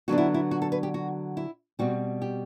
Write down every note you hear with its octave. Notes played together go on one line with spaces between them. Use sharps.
D3 F#3 B3 D4 F#4
E4
E4
F#4
A4
B4
G4
F#4
E4
B2 G3 C4 F#4
G4